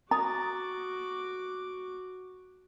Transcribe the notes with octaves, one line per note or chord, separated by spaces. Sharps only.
F#4 A#5 D6 D#6 A6